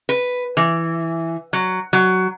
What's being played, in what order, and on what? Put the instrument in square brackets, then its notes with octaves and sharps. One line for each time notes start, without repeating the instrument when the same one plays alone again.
[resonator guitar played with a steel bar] B4
E3
F#3
F#3